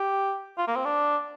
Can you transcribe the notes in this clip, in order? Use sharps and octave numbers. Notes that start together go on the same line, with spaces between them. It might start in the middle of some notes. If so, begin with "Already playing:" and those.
Already playing: G4
F4
A#3
C4
D4